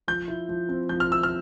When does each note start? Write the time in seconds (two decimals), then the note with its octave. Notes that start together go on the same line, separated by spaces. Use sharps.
0.08 F3 G6
0.28 E4
0.49 F3
0.69 C4
0.89 F3 G6
1.00 F6
1.09 E4 E6
1.23 F6